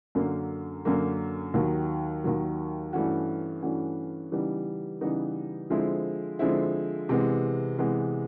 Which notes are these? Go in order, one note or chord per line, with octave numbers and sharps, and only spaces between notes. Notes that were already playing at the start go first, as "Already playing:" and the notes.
F#2 D3 F#3 A#3
F#2 D3 F#3 A#3
D#2 D#3 F#3
D#2 D#3 F#3
G2 E3 A3 C#4 F#4
G2 E3 A3 C#4 F#4
C#3 E3 G3 B3 D#4
C#3 E3 G3 B3 D#4
D3 F3 G#3 C4 E4
D3 F3 G#3 C4 E4
C3 E3 G#3 B3
C3 E3 G#3 B3